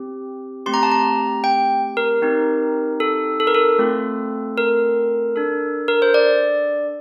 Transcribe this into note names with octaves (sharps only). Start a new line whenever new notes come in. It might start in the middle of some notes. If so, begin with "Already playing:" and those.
Already playing: C4 G4
A3 C4 G4 C6
A#5
A5
A#5
G5
A#4
C4 D#4 G4
A4
A4
A#4
A4
A3 C4 F4 A4
A#4
D4 A4
A#4
C5
D5